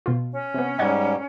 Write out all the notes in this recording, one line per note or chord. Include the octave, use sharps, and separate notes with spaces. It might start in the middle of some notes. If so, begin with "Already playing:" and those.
B2 F4
C#4
C3 B3
G#2 G3 D#5 F#5 G#6